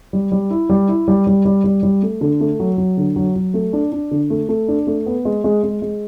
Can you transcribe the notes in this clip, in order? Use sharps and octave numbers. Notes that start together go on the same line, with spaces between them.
G3
G3
E4
G3
E4
G3
G3
G3
G3
G3
A3
D3
A3
F#3
F#3
D3
F#3
F#3
A3
D4
D4
D3
A3
A3
D4
A3
B3
G#3
G#3
G#3
G#3